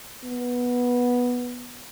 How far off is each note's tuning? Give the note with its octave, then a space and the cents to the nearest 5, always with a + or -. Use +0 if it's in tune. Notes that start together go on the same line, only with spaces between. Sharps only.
B3 -10